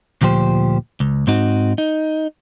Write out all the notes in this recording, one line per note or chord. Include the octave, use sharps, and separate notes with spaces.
D2 A#2 F3 G4 C5
C#2
G#2 C4 D#4 F#4
D#4